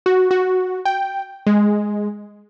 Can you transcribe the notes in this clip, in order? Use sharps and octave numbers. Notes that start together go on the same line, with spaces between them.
F#4
F#4
G5
G#3